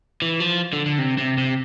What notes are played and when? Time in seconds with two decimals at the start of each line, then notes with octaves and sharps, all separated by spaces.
0.22 E3
0.40 F3
0.73 D3
0.86 D3
0.98 C3
1.18 C3
1.38 C3